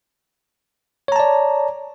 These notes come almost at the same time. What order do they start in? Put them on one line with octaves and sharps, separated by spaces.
C#5 A#5 A5 D5